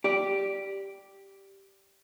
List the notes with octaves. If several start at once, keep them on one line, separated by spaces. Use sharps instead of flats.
G4 D5